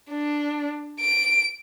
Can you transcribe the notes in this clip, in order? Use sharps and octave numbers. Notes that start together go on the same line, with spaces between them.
D4
D7